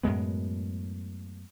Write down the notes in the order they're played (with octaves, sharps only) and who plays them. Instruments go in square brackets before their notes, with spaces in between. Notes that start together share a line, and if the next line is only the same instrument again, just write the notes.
[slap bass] F#2 A2 G#3 B3